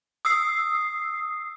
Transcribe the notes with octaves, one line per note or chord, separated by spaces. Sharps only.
D#6 E6 C7